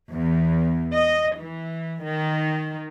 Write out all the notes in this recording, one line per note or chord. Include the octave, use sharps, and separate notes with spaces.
E2
D#5
E3
D#3